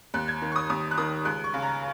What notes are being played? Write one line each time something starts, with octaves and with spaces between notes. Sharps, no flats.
D#2 F#6
G#6
D#3
C#6
D#6
D#2 D#6
F#6
D#3 D#6
C#2 F#6
C#6
C#3
A#5